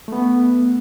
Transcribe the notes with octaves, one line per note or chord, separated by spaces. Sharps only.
A3 B3